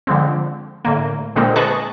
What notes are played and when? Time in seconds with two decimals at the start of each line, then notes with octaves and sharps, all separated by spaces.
0.07 D3 F3 G#3 C4
0.85 A2 D3 A#3
1.35 A#2 D3 G#3 A#3 C4
1.56 G#4 B4 D#5 A5 C#6 F#6